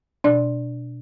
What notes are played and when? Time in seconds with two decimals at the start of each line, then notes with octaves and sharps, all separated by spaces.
0.24 B2 D4 D5